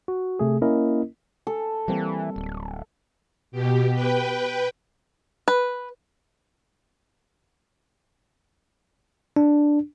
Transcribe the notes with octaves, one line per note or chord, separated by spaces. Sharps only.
F#4
C3 A3 G#4
A#3 C#4 E4 A#4 D#5
A4
E3 G3 A#3 C4
D1
B2 G4
B4 G5
B4
D4